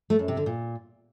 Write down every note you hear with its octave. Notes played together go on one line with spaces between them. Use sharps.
A3
F#2
C3
D3
A#2